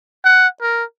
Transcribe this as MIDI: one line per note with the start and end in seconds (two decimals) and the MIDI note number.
0.24 0.47 78
0.61 0.83 70